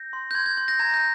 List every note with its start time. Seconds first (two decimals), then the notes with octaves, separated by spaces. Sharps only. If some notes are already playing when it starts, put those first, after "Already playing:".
Already playing: G6 A#6
0.13 C6
0.31 G6
0.35 C6 G#6
0.46 G#6
0.57 C6 G6
0.68 G6 A#6
0.79 A#5 G#6
0.94 G6